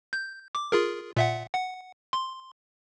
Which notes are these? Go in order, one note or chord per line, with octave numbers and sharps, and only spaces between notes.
G6
D6
F4 G#4 A#4
A#2 E5 F#5
F#5
C6